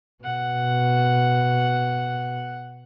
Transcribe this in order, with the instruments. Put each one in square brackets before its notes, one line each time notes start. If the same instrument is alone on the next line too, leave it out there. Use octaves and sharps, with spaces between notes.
[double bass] B2 [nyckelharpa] F#5